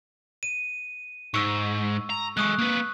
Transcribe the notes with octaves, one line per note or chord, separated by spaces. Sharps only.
D#7
G#2 C#6 E6
A#5
G#3 A4 C#6 D#6 F#6
A#3 B4